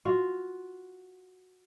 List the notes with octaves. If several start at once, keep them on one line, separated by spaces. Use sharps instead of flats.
F4 F#4 F5